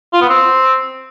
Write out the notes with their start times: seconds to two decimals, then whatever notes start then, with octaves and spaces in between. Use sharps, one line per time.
0.13 F4
0.21 B3
0.29 C4